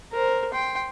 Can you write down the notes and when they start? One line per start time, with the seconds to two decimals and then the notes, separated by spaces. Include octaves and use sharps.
0.12 A#4 C5
0.53 G5 C6